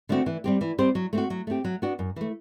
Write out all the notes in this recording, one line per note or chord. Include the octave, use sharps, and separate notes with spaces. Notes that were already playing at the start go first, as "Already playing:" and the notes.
D3 A3 C4 F#4
E3
G3 C4 G4
E3
G3 C4 G4 C5
F#3
A3 C4 F#4
F#3
A3 C4 G4
F#3
B3 D4 F#4
F#2
E3 A3